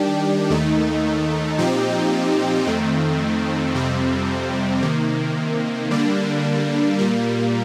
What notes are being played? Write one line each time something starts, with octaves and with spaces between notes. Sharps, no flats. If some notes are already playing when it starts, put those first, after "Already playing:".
Already playing: D#3 G3 D4 G4
D#2 D#3 A3 D#4
A#2 F3 C4 D#4 G4
F2 D#3 A3 C4
F2 C3 G3 C4
C3 D#3 A#3
D3 G3 A#3 D4
A#2 G3 A#3